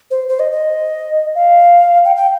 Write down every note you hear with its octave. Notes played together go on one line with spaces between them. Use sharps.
C5
C5
D#5
D#5
F5
G5
G5